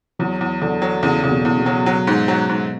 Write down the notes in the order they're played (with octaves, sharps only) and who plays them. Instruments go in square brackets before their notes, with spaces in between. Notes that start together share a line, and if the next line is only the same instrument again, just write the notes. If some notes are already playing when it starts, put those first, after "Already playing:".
[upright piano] E2 [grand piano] F#3
[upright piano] E2
[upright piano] E2 [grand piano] D3
[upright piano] F#3
[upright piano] E2 [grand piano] C#3
[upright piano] E2 [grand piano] C#3
[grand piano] B2
[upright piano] E2
[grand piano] B2
[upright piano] F#3
F#3
G#2
F#3
G#2